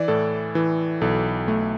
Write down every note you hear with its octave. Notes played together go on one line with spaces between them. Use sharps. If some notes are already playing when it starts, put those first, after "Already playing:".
Already playing: E3 D5
A2 A4
E3
B1 A4
A3